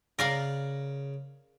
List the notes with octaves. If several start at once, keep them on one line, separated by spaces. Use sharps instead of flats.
C#3 A#4 D5 F5